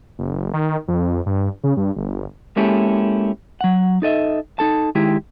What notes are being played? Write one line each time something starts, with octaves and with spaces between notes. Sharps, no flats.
F#1
D#3
F2
G2
C#3
G2
G1
G#3 A#3 C#4 E4 G4 A4
F#3 F#5
D#4 A4 D#5 E5
D#4 A4 A5
D#3 G#3 E4 G4